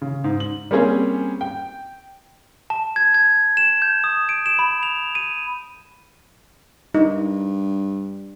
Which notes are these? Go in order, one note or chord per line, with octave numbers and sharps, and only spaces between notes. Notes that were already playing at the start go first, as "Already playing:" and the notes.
C#3
G#2
F#7
G3 A#3 C4 C#4 G#4
G5
A5
G#6
G#6
E7
G6
D#6
D7
E7
B5
F7
D#7
G2 D#4